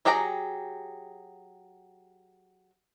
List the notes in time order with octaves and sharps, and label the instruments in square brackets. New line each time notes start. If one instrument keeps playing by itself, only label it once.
[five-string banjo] F#3 G4 G#4 G5 A#5